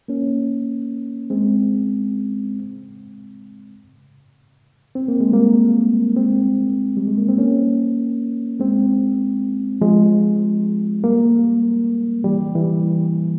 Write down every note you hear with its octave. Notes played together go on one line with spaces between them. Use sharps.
A#3 C#4
G#3 C4
C4
A#3
G#3
G3 A#3
G#3 C4
G3
G#3
A#3
C4
A#3 C#4
G#3 C4
F3 G#3
G3 A#3
E3 G3
E3 G3